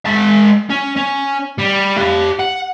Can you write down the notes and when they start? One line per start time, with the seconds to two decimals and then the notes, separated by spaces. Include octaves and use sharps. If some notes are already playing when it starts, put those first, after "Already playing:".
0.06 G#3 A5
0.70 C#4
0.96 C#4
1.58 G3
1.97 G4 F5
2.40 F#5